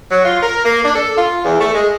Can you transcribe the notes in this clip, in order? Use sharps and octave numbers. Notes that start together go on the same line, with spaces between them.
F#3
F4
A#4
A#3
D4
A4
F4
E2
A3
G#3